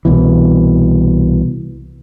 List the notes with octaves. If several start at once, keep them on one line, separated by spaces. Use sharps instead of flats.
C2 B2 E3